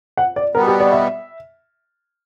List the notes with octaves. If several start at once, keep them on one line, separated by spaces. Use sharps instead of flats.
F#5
D5
B2 G3 B3 A#4
G4
D5
E5